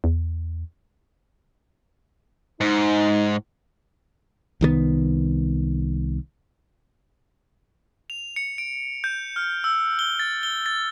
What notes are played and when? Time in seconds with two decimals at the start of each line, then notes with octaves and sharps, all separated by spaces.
0.04 E2
2.61 G#2 D#4
4.61 C2 D#3 G3 B3
8.10 F7
8.36 C#7
8.58 D7
9.04 G6
9.36 F6
9.64 E6
9.99 G7
10.19 A6
10.43 G7
10.66 A6